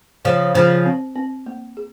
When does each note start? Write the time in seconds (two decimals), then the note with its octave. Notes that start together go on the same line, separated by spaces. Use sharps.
0.25 C#3 F3 C5
0.55 C#3 F3 C5
0.86 C4
1.16 C4
1.46 A#3
1.77 G#4